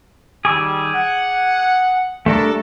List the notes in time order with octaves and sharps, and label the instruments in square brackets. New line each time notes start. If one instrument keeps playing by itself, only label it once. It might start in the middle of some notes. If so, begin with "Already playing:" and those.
[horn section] D#3 G3 [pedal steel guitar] G#4 D6 E6
[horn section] F#5
[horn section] G3 A4 [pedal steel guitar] A3 D4 A#4